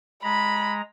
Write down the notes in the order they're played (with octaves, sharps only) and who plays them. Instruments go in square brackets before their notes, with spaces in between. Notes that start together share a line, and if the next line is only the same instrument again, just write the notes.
[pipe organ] G#3 A#5 [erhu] B5